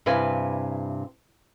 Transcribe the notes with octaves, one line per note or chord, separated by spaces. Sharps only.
G2 C3 E4 B4 F5 G#5